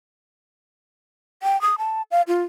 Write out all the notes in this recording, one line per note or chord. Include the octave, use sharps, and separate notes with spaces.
G5
D#6
A5
F5
F4